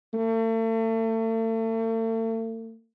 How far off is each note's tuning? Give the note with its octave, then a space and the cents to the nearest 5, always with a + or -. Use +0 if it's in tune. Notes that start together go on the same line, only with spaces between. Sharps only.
A3 +40